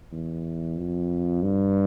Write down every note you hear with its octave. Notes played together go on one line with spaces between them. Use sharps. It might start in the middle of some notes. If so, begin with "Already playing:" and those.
E2
F2
G2